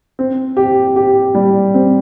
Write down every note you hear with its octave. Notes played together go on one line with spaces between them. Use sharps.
C4
G4
G4
G3
C4